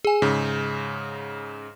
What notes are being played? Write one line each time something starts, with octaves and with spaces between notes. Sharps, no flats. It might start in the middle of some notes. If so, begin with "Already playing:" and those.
G#4 G#5
G#2 C#3